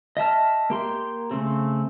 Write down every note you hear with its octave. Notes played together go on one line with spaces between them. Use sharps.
D#5 E5 A5 F6
A#3 G4 C6
C#3 A3 C4